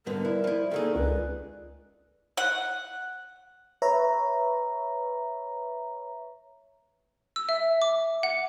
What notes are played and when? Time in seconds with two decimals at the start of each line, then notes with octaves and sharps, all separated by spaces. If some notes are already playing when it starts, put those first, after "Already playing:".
0.06 G#2 D3 G3 B3 A#4 B4
0.25 E4 D5
0.44 F3 E4
0.71 D#3 A#3 G#4 A4
0.95 C#2 B4
2.37 F#5
3.82 B4 C#5 E5 A#5
7.36 E6
7.49 E5
7.82 D6
8.23 F#5